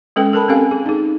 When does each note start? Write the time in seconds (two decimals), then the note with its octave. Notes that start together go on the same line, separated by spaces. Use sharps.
0.16 G#3 C#4 A4 B4 G5
0.33 A4 A#4 A5 B5
0.48 C4 C#4 G4 A4 F5 G#5
0.71 G#4
0.86 D#4 G#4